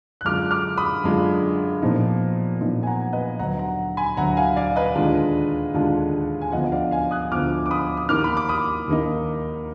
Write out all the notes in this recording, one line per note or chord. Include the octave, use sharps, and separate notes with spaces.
F#6
F#2 D3 G#3 D4 F4 D6 F6
D6 F6
B5 D#6
F#2 D3 G#3 D4 F4
A#2 F3 B3 D#4
A#2 F3 B3 D#4
G#5
F#5 A#5
B4 D#5
D2 D3 F#3 F#5 A#5
F#5 A#5
G#5 B5
D2 D3 F#3 F#5 A#5
F5 G#5
D5 F5
B4 D#5
D#2 D3 G#3 D4 F4
D#2 D3 G#3 D4 F4
G#5
D2 D3 F3 B3 F4 D#5 F#5
D#5
D5 F5
F5 G#5
D#6 F#6
D2 D3 F3 B3 F4 D6 F6
D6
B5 D#6
D#6
D#2 D#3 A#3 D#4 D6 F6
B5
D6
B5 D#6
D#2 D#3 A#3 D#4